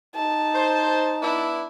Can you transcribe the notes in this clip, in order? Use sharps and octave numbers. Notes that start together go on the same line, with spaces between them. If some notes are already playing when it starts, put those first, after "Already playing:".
D#4 A5
C5
B3 D4 E4